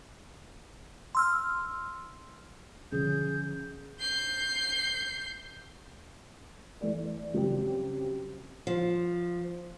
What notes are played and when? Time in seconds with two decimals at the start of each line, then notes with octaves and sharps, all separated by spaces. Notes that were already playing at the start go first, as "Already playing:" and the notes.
1.15 C6 E6 F6
2.92 B2 D3 F3 C#4 G#4 G6
4.00 G6 C7
6.81 E3 A3 D5
7.34 C#3 F#3 G3 C4 C#4 G4
8.67 F3